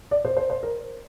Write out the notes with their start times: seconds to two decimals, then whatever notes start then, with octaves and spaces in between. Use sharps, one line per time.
0.11 D5
0.25 C5
0.37 C5
0.50 C5
0.63 A#4